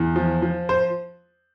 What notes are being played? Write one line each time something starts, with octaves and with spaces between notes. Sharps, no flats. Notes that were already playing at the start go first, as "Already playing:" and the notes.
Already playing: E2
F3
F3
C5